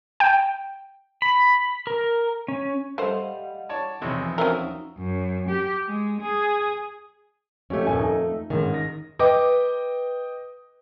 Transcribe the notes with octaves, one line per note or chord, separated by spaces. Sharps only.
G5
B5
A#4
C#4
G3 A3 C5 D#5 F5 F#5
C#5 D5 A5
B1 E2 C3 F3 C#5 G#5
F#3 C4 C#4 D#4 A#4 E5 F5
F#2
G4
G#3
G#4
F2 A3 C#4 G4
D#1 C#4 G#5
D#4 A4
A1 G#2 D#3
A#6
B4 D#5 G5 D6